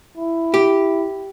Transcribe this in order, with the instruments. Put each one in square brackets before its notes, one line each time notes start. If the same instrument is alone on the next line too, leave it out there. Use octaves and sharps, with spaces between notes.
[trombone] E4
[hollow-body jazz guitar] G4